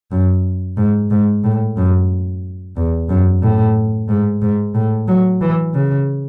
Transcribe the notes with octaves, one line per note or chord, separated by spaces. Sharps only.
F#2
G#2
G#2
A2
F#2
E2
F#2
A2
G#2
G#2
A2
F#3
E3
C#3